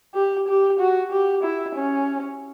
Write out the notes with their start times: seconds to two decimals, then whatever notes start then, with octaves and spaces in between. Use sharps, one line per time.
0.15 G4
0.48 G4
0.80 F#4
1.12 G4
1.44 E4
1.75 C#4